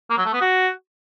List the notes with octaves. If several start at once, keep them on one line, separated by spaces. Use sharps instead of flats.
A#3
F#3
A3
B3
F#4